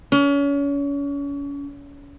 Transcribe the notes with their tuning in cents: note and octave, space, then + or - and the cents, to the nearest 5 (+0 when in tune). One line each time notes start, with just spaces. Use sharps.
C#4 +35